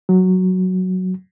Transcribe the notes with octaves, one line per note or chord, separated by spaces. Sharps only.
F#3